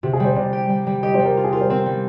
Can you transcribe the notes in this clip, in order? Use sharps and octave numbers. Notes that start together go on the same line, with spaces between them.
C3 G4
G#4
G3 C5
C3 D5
G4
G3
G3
G4 D#5
C5
G3
A#4
F4
G#4
F4 A#4
C5
C4 A#4
G3